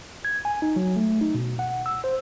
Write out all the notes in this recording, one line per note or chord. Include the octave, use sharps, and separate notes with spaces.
G#6
G#5
D#4
F#3
A3
D#4
B2
F#5
E6
C5